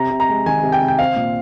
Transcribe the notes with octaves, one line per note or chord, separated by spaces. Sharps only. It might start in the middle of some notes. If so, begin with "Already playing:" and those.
Already playing: C3 A#5
C3
A#5
G#3
D#3 G#5
C3
G5
C3
G5
C4 F5
A#2